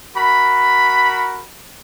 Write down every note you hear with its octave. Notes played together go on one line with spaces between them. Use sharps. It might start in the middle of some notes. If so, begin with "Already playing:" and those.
F#4 A#4 B5